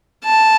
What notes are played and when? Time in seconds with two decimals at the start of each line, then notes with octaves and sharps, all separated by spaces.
0.24 A5